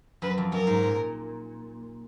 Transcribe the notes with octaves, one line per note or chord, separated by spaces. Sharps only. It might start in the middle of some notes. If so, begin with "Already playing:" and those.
F#2 B4
F2
F#2 A#4
G#2
A#2